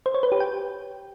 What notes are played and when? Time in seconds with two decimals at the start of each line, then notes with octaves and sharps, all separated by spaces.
0.06 C5
0.14 C#5
0.23 B4
0.32 G4
0.40 G5